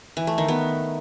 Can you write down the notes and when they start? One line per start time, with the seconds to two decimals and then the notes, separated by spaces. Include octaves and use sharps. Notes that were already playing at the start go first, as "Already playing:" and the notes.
0.17 E3
0.27 A3
0.38 D#3
0.48 B3